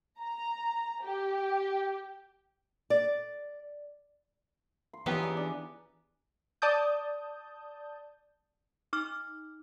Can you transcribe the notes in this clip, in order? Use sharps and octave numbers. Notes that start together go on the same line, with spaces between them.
A#5
G4
D5
C6
C#3 E3 F3 B3 D#4 G4
D5 G#5
D4
D5 A5 D#6 G6
D#4 D6 F6